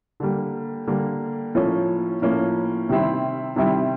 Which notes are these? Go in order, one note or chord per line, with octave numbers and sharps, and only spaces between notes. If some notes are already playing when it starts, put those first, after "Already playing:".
D3 G3 A#3
D3 G3 A#3
A2 F3 A#3 C#4
A2 F3 A#3 C#4
C3 D#3 G3 C4 E4
C3 D#3 G3 C4 E4